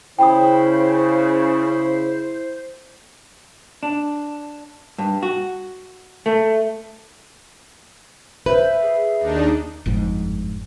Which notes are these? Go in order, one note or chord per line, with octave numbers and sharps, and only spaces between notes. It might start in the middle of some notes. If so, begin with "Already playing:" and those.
C#3 E4 C5 G5 B5 D#6
D4
G2
F#4
A3
B4 C5 E5
G#4
D#2 D4 D#4
G1 F2 G#2